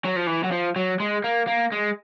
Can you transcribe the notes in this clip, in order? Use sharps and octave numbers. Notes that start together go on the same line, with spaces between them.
F#3
F3
E3
F#3
F3
F#3
G#3
A#3
A#3
G#3